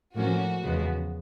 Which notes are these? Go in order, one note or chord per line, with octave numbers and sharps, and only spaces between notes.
A2 F3 A#3 C#4 F#4
E2 C#3 F3 G#3 B3